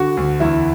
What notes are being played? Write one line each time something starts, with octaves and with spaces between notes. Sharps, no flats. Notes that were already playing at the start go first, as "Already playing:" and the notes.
Already playing: D3 F#4
D2
E2 E4